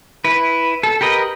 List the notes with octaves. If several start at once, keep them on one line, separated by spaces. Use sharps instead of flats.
E4 B4
A4
G4 A#4 B4 D#5